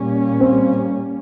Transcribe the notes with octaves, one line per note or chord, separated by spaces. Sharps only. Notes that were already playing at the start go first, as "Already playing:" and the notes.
Already playing: A#2 G3 A#3 C#4
C4